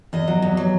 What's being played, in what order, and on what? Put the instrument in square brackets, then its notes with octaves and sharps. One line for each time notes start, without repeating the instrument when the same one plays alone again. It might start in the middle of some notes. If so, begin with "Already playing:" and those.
[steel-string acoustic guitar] E2 D#5
F#3
E2
F#3